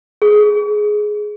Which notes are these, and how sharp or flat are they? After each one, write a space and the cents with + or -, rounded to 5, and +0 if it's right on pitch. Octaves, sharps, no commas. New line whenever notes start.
G#4 +10